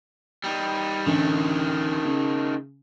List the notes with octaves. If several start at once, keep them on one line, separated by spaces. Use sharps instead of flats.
G3 D#4
A1 D2 D#3 A3
C#3